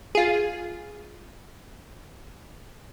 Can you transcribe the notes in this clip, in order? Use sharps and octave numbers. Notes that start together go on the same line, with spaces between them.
F4 G#4